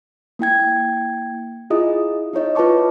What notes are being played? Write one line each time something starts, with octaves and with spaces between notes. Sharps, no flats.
A#3 E4 G5 G#6
E4 F4 G#4 D#5 D#6
D#4 E4 C#5 D#5
F4 B4 D#5 A5 C#6 D6